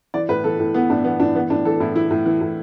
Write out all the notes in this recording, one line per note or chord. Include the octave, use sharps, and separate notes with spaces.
E3 D5
A2 B4
E3 A4
A2
E3 B3
A2 D4
E3 B3
A2 D4
E3 B3
A2 D4
E3 A4
A2 E4
E3 E4
A2
E3
A2